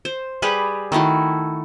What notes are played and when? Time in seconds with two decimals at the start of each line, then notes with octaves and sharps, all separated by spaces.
0.05 C5
0.42 G3 G4 G#4 B4
0.92 D#3 A3 E4 F#4